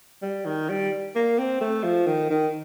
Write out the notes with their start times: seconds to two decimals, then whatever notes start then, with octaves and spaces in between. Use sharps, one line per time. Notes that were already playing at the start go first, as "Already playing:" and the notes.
0.22 G3
0.45 D#3
0.69 G3
1.16 A#3
1.38 C4
1.61 A3
1.84 F3
2.07 D#3
2.30 D#3